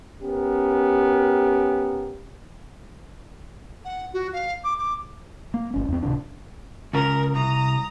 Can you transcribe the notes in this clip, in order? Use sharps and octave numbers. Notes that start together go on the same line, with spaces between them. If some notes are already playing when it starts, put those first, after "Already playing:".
B3 C#4 G4 A#4
F#5
F#4
F5
D6
D6
A#3
G1 C#4
E2 C4
D1 C3 D#3 D4
C#2 C#3 A#4
C2 A#5 D#6